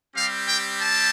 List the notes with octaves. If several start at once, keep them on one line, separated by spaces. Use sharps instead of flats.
G3 C4 G4 F5
G5
A5